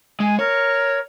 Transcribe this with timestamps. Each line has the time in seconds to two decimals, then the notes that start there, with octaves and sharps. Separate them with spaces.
0.20 G#3 G#5
0.39 A#4 C#5